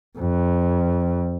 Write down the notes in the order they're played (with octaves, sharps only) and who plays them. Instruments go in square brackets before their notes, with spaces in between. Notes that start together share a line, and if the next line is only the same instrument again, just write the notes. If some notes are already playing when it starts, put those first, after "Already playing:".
[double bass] F2